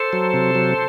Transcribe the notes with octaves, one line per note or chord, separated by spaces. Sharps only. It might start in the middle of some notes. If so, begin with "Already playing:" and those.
Already playing: A4 C5
F#3
C3
F#3